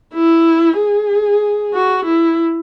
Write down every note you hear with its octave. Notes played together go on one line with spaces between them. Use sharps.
E4
G#4
F#4
E4